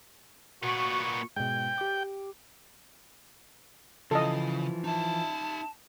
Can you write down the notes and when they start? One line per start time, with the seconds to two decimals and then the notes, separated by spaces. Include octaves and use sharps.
0.63 A#2 B3 F#4 C#6
1.36 G#2 B2 G5
1.78 G4 D6
4.11 C#3 E3 F3 A4 D#5
4.84 D#4 E5 A5